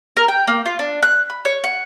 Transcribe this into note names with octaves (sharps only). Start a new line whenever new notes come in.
A#4
G5
A#3
F4
D4
F#6
B5
C#5
F#5